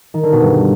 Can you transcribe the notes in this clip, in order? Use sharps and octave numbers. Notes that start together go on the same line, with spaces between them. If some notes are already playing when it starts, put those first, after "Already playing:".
D#3
D3
B2
G2